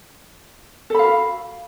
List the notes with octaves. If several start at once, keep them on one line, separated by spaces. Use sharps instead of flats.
F#4 A4 F5 B5